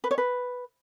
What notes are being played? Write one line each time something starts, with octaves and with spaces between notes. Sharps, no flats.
B4
C#5
B4